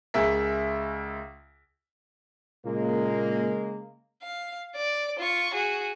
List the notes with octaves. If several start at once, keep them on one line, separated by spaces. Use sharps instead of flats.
C#2 G#4 A#4 E5 B6
A#2 C#3 G#3 A#3
F5
D5
F4 C#6
F#4 G#4